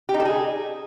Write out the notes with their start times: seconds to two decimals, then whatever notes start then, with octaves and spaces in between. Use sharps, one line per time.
0.09 G4
0.14 D#4
0.20 A4
0.25 G#4